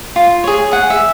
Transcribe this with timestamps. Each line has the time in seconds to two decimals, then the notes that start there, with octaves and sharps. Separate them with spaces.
0.16 F4
0.44 G#4 C#5
0.72 G#4 F#5
0.90 E5